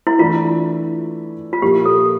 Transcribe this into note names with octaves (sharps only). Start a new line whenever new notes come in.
E4
E3 A3 D4 F4 A4
F4
A#2 F3 A#3 E4 G4
A4